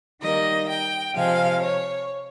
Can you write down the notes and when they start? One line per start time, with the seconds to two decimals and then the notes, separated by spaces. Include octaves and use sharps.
0.21 D#3 G3 A#3 D#5
0.68 G5
1.15 C3 F3 G#3 F5
1.61 C#5